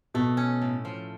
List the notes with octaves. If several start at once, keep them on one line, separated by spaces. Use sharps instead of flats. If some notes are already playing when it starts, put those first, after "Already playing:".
B2 A3
C#4
A2
F3